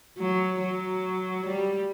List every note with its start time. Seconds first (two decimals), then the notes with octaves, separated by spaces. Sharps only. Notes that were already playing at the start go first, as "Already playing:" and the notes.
0.17 F#3
0.61 F#3
1.46 G3